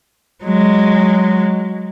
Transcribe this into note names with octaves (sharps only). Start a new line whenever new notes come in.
F#3 G#3